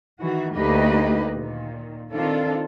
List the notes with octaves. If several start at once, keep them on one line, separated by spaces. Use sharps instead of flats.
D#3 E3 F#4
D2 A#3 D#4 G4 B4 D#5
A#2 D#3
D#3 C4 D4 F4 A4